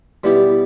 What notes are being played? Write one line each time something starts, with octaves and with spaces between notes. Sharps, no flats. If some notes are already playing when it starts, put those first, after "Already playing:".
B2 G3 B3 E4 G4